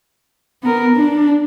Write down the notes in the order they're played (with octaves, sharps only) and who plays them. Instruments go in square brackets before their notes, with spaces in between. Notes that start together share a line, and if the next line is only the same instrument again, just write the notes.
[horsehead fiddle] B3 A#4
D4